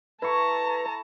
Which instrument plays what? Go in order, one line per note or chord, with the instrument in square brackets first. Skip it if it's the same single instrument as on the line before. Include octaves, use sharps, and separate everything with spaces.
[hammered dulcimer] E4 A4 C#6 [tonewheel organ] B4 [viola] A5 A#5